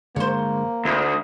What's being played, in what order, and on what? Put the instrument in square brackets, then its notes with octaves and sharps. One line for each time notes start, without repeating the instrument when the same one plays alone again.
[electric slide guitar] G2 D3 G#3 [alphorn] A#3 [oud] C5 C#5
[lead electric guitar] D2 [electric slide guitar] A3